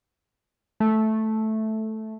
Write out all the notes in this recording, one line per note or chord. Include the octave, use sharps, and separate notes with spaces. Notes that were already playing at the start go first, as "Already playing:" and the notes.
A3